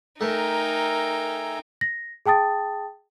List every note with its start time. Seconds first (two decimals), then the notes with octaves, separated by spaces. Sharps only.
0.21 A3 D#4 A#4 E5 G5 G#5 A#5
1.81 A#6
2.26 G#4 G5 A5 D#6 A6